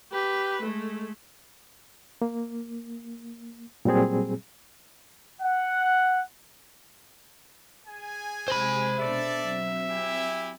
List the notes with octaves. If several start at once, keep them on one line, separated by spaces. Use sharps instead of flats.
G4 B4
G#3 A3
A#3
A#2 F#3 G3 C4 G#4
F#5
G#4 G#5
C3 G#3 C5 B5
B2 D4 A4 D5 E5
F#3 C4
E4 G4 G#5